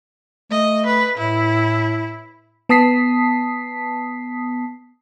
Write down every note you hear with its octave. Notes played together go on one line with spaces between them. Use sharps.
A3 D#5
B4
A2 E4
B3 A5 D#6 B6 C7